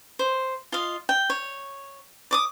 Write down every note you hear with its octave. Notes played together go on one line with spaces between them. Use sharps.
C5
F4 D#5 F5
G5
C#5
D5 D6 D#6